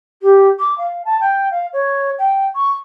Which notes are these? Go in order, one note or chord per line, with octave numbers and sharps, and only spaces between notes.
G4
D6
F5
A5
G5
F5
C#5
G5
C#6